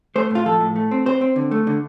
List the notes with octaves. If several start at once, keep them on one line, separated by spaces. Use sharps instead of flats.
A3 C5
A2 F4
F3 A4
A2
A3
C4
C4 C5
C4
D3
A3
D3